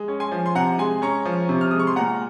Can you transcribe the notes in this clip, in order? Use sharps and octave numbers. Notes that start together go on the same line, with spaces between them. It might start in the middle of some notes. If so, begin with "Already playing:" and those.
Already playing: G#3
C#4
G#5 C6
F3
C6
C3 F#5 A#5
G#3 G#5 C6
C#4 A#5 C#6
F3
C3
F6
G#3 D#6
C#6
C6
A#2 F#5 A#5